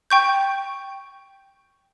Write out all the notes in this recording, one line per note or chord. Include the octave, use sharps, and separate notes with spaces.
G5 C#6 G6